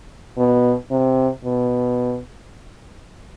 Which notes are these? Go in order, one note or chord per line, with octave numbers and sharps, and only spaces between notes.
B2
C3
B2